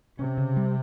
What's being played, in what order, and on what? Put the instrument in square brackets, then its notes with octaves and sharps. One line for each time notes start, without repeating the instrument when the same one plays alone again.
[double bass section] C3 [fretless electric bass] C#4
[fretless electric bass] C#3
G3